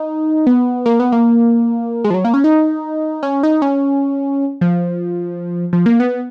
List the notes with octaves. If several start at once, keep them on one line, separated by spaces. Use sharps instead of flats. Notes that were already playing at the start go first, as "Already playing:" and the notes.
Already playing: D#4
B3
A#3
B3
A#3
G#3
F3
F#3
A#3
C#4
D#4
C#4
D#4
C#4
F3
F3
A#3
B3